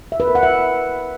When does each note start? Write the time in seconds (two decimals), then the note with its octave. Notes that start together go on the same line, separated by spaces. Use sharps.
0.12 E5
0.20 B4
0.27 A#4
0.35 F#5
0.43 E5